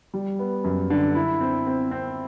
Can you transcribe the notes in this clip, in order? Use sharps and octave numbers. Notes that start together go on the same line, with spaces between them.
G3
B3
F#2
D3
E4
C4
C4
C4